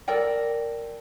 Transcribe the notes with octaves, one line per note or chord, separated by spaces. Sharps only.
A4 A#4 D5 G5